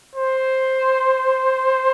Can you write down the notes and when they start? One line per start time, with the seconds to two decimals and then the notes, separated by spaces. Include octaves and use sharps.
0.16 C5